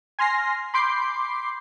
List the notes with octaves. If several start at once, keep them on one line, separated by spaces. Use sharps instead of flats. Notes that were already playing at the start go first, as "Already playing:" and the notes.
G#5 C6 F6 A#6 C7
B5 C6 D6 G6 C7